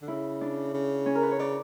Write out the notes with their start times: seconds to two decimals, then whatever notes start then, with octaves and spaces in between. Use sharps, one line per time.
0.02 D3
0.08 C#3 E4
0.41 D4
0.74 C#3
1.06 C#4
1.15 A#4
1.23 B4
1.31 C#5
1.39 C#3 D5